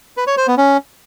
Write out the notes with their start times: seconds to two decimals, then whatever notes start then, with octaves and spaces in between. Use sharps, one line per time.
0.17 B4
0.27 C#5
0.37 C5
0.47 B3
0.58 C#4